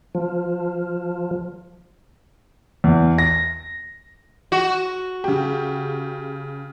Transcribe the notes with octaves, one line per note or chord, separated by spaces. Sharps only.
F3
E2
A#6
F#4
C#3 G4